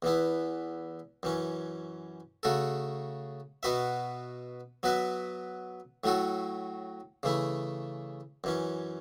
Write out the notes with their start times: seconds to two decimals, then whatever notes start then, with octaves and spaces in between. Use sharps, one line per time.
0.02 E2 E3 B3 E4
1.23 F#2 E3 C#4
2.43 C#3 A3 F#4 A4
3.63 B2 B3 F#4 B4 E5
4.83 F#3 B3 F#4 B4 E5
6.04 A2 F#3 A3 F#4 A4
7.23 C#3 E3 A3 E4
8.44 F#2 E3 C#4